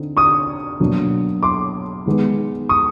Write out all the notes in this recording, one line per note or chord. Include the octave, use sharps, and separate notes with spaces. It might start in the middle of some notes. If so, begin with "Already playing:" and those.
Already playing: D3 C4 D#4
C#6 D#6
B2 F#3 A#3 D4
C6 D6
D#3 G#3 B3 D#4
C#6 D#6